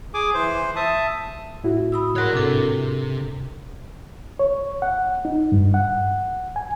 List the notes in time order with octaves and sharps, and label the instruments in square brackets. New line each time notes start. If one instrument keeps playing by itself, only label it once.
[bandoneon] G#4 G#5 D6
E3 C5
E5 A5 D#6
[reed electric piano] A2 E4 F#4
[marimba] B5 D#6 E6
[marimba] G#2 A#4 F#6 [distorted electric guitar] C#5 F#5
[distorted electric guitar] C3 [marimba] D4 A4
[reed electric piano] C#5
F#5
D#4
G2
F#5
G#5